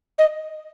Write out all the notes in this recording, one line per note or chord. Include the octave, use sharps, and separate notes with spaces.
D#5